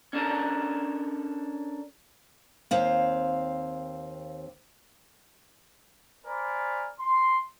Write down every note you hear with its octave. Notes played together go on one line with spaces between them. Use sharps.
C#4 D4 A4 A#4
D#2 C4 F5
A#4 C5 D5 G#5 B5
C6